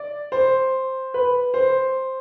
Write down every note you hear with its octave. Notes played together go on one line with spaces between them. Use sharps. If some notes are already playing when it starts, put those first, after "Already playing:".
Already playing: D5
C5
B4
C5